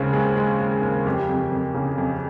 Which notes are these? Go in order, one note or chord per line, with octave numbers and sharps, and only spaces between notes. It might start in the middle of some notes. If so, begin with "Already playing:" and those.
Already playing: D#2 C#3 G#3 C4
G#3
G#3
G#3
D#2
F2 G4
F2
F2
C#3
F2